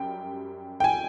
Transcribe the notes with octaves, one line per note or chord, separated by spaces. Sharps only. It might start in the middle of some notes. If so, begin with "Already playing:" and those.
Already playing: F#2 G3 G5
G5
G#5